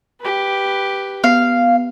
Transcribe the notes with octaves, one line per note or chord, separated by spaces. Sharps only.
G4 B4
B3 F5